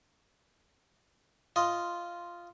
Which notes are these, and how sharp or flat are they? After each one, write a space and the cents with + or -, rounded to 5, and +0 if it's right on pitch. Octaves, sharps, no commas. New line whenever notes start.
F4 -5 D#5 +0